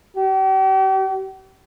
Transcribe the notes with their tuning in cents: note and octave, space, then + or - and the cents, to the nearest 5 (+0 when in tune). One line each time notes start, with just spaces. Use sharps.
G4 -40